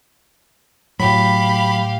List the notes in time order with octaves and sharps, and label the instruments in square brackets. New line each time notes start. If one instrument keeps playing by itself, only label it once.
[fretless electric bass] A2 [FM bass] F#3 [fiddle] G4 F5 [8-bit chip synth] B5